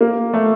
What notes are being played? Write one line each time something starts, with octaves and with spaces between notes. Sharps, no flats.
A#3
A3